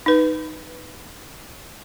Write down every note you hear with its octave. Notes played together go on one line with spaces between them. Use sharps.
D#4 B4